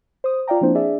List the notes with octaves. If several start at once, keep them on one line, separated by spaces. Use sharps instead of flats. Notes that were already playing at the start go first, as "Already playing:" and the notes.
C5 D#6
F4 D5 F5 G5 A#5
F3 A#3 C4 D4 E4 C5
D4 G#4 D5 E5